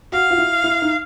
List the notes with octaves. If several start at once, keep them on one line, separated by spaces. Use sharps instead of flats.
F#4 F5
F4
E4
E4
D#4